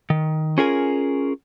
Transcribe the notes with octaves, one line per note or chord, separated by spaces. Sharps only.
D#3
C#4 F4 G#4 A#4 G#5